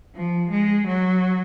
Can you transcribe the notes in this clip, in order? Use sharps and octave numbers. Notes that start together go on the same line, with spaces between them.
F3
G#3
F#3